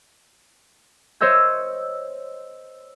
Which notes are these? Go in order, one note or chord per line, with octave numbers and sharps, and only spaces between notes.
C5 C#5 D#5 E6 G6